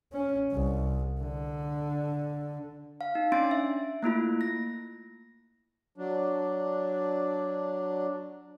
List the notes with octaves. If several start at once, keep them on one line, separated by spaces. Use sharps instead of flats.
C#4
C2
D3
F5
D#4
C#4 D4 C6 A6 D7
E5
A3 A#3 E4 F4
A#6
F#3 D4